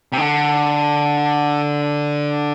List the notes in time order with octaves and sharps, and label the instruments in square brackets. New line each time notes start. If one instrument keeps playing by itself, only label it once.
[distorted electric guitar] C3
D3